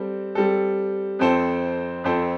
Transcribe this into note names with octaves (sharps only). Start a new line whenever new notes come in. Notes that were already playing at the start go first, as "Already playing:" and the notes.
Already playing: G3 C4 A4
G3 C4 A4
F2 F3 C4 A4 C5
F2 F3 C4 A4 C5